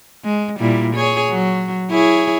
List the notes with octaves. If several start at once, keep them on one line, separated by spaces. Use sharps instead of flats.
G#3
A#2 G3 E4
G#4 C#5
F#3
E4 G#4 C#5